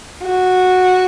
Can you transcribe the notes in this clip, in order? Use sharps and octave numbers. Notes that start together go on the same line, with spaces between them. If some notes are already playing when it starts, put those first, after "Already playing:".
F#4